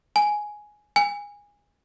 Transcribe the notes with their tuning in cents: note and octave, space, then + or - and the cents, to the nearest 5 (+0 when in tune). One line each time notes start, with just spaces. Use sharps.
G#5 +10
G#5 -20